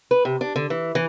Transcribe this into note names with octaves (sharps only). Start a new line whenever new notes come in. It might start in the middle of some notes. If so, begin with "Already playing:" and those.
B4
C3
D4
D3
E3
E3